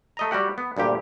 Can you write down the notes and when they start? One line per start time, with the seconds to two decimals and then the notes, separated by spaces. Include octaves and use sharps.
0.17 A3 D#5 A#5
0.31 G3 F#4 G4 F#5
0.58 B3
0.77 D2 G2 A#2 G4